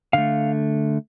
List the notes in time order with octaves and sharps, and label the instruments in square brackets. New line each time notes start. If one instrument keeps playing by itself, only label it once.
[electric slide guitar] D3 A3 F5